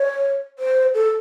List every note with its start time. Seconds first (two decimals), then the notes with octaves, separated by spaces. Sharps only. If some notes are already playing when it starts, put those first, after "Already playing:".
Already playing: C#5
0.59 C5
0.94 A4